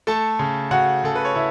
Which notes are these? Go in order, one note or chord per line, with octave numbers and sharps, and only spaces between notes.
A3 A4 A5
C#3
C#3 F#4 F#5
C#3 A4
B4
C#5
C#3 E4 E5